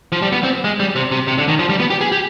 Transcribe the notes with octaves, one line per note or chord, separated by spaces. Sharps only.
F3
G3
B3
C4
G#3
G3
C3
C3
C3
D3
D#3
F3
G3
B3
G4
G#4
G4